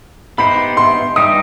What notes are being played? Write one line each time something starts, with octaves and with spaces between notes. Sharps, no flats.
B3 D#4 G4 C5 B5
C6
G3 D#4 G4 D#6